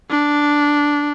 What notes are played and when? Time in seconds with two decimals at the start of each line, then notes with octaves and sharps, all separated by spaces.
0.10 D4